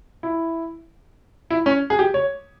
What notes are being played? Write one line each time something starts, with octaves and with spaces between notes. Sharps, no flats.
E4
E4
C#4
G#4
G4
C#5